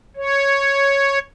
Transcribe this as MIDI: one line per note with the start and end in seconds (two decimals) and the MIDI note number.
0.16 1.19 73